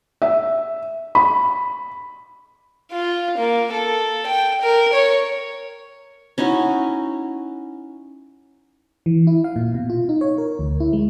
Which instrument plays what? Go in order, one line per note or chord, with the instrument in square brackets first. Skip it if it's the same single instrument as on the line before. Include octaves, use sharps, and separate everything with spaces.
[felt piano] E5
B5
[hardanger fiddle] F4
A#3
A4
G5
A#4
C#5
[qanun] C#4 D#4 E4 F#4
[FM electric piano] E3
E4
F5
A#2
B2
F4
D#4
C#5
A#4
D2
E4
G#3